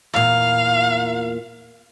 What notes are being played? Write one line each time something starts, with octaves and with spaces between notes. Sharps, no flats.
E2 A#2 F5